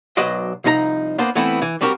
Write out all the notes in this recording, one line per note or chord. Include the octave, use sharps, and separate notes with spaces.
B1 F#3 B4 C5 D5 D#5
C2 F3 D#4 A4 A#5
A#3 B3 D4 C5
E3 A3 B3 C4 E4
E3
G3 C4 F#4 G4 A#4